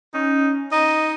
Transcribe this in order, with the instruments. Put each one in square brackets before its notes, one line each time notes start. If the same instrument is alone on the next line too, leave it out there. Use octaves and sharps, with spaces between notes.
[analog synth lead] C#4 [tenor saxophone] D#4
[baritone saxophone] D#4 [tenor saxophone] D#5